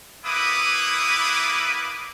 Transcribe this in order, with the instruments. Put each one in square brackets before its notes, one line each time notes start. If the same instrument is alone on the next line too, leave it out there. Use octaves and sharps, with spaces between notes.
[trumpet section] A#3 B3 E4 B4 D6 D#6